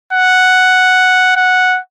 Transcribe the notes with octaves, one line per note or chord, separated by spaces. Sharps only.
F#5
F#5